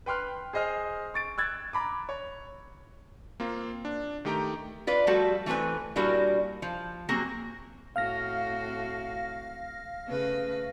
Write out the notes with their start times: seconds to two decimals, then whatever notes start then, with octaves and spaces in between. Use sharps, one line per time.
0.06 B4 G5 C6 F6 F#6
0.53 G#4 C5 D#5 G#5 F6
1.14 C#6 A6 D7
1.38 E6 F#6 G#6 A6
1.73 A#5 B5 D6
2.09 C#5
3.40 A#3 C4 F4
3.85 D4
4.25 D#3 A3 G4 G5 A#5
4.87 F4 B4 D5
5.07 F3 G3 A3 F#4 A4
5.46 E3 A3 C4 B4 G#5
5.96 A#2 G3 D4 E4 F#4 A#4
6.62 F3
7.09 F#3 A#3 C4 F#4 G#4 A#4
7.96 A2 C4 F#4 F5 F6 A#6
10.06 C#3 A3 B4